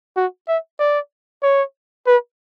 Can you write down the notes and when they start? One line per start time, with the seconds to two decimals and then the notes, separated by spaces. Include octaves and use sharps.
0.17 F#4
0.48 E5
0.80 D5
1.43 C#5
2.07 B4